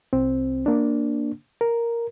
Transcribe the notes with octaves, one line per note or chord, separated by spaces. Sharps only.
C2 C4
A#3 D4
A#4